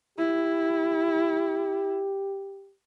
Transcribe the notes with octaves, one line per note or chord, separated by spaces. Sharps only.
E4 G4